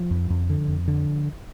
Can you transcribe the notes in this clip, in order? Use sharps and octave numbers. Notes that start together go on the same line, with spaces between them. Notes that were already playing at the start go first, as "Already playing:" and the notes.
Already playing: F3
F2
F2
D3
F2
D3